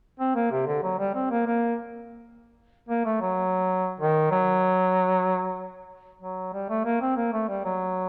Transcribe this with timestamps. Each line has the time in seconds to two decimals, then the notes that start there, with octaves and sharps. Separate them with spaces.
0.20 C4
0.36 A#3
0.52 C3
0.67 D3
0.83 F#3
0.99 G3
1.15 C4
1.31 A#3
1.47 A#3
2.89 A#3
3.05 A3
3.21 F#3
4.00 D#3
4.31 F#3
6.22 F#3
6.54 G3
6.69 A3
6.85 A#3
7.01 C4
7.17 A#3
7.33 A3
7.49 G3
7.65 F#3